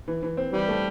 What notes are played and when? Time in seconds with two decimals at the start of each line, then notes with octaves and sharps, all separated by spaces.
0.08 E3
0.23 E3
0.37 C4
0.53 E3 G3
0.68 A3